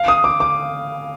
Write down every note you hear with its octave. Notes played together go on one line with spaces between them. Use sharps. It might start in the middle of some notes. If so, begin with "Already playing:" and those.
Already playing: F5
D#6
D6
D6